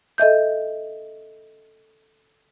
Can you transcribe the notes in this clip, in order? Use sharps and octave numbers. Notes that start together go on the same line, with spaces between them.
A4 D#5 E5 G6